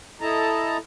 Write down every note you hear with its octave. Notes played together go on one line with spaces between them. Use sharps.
E4 A4 D#5 A5 A#5